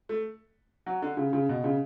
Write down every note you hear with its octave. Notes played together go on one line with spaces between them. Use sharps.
A3
F#3
D3
C#3
C#3
B2
C#3